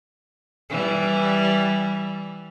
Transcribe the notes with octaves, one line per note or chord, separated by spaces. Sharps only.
E3 G3